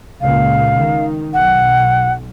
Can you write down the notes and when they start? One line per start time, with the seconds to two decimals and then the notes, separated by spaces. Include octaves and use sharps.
0.21 C#2 A#2 F5
0.78 D#3
1.34 B1 F#5